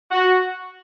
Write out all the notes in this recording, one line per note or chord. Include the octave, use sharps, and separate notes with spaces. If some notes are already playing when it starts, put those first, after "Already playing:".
F#4